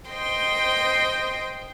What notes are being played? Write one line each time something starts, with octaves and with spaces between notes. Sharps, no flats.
C5 D#5 G5 C6